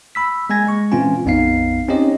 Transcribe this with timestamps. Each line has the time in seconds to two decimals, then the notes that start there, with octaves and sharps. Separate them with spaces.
0.15 B5 E6 B6
0.50 G#3 A#3 G#5 G#6 A#6
0.67 G#3 C#6
0.92 A#2 E3 C4 C#4 F4 G#5
1.25 A#1 F2 B3 D#4 F5 C7
1.89 C4 C#4 D#4 G4 C#5 D#5